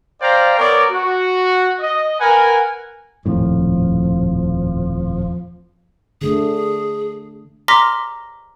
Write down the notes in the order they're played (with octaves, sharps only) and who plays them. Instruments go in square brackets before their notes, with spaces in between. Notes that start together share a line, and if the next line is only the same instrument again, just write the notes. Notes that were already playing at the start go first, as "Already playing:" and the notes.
[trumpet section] C5 D5 F5 G5 A#5
B3 A#4 C#5 D5
F#4
D#5
A#4 B4 F#5 G#5
[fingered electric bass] D#1 F2 A2 [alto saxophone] F3
[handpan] D3 A3 [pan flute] G#4
[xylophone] A#5 C6 D6 F6 A#6 B6